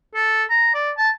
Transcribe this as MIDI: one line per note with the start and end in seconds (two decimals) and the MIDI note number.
0.15 0.44 69
0.50 0.71 82
0.74 0.91 74
0.98 1.10 81